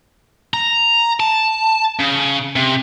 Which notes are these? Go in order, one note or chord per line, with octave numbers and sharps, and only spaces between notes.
A#5
A5
C#3
C3